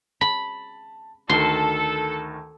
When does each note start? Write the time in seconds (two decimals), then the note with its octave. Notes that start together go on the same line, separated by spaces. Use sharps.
0.21 A5 B5
1.29 D2 D#3 A4 A#4 C6